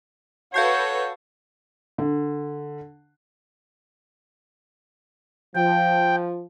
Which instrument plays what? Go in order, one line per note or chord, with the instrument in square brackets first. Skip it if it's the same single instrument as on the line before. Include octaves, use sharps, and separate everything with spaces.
[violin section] F#4 A4 B4 [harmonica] C#5 [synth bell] F5 G6 C7
[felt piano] D3
[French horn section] F3 [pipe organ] G5